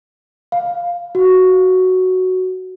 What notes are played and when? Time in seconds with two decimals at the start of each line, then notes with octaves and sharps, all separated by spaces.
0.52 F5
1.15 F#4